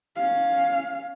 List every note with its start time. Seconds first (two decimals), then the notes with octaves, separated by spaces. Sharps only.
0.16 C#4 F5